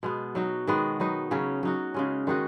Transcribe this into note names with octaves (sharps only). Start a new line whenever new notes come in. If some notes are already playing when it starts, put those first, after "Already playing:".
B2 G#3 B3
F#3 D#4 F#4
D#3 G#3 B3 F#4
F#3 B3 D#4
C#3 F#3 C#4
F#3 D#4 F#4
C#3 G#3 C#4
D#3 G#3 D#4 F#4